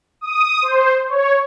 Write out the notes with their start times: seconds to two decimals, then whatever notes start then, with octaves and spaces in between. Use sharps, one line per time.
0.21 D#6
0.62 C5
1.10 C#5